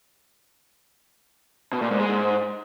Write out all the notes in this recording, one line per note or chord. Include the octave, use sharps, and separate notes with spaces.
B2
A#2
G#2
G#3
G#2